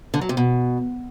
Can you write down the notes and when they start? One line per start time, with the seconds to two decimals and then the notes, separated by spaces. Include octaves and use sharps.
0.14 D3
0.21 F#3
0.29 C3
0.37 B2